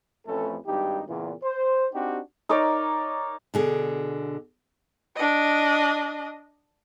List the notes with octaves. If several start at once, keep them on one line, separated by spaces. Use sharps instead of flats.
A1 F2 A3 C#4 A4 B4
G#1 G2 D#4 G4
E2 A#2 C#3
C5
C4 D4 D#4 F#4 G4
D#4 A#4 C#5 D5
B2 D3 G#4
D4 D#5